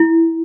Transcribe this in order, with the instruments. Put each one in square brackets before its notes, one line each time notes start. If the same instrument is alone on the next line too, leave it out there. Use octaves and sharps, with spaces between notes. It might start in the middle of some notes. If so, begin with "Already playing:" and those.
Already playing: [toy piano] E4